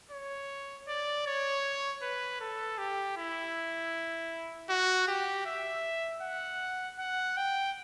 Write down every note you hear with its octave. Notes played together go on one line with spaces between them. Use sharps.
C#5
D5
C#5
B4
A4
G4
E4
F#4
G4
E5
F#5
F#5
G5